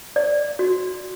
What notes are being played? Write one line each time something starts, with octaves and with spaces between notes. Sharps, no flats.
D5
F#4